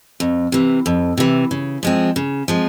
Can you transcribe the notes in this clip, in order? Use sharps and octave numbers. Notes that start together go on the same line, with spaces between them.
F2
C3 E3
F2
C3 E3
C#3
F3 G#3 C4
C#3
F3 G#3 C4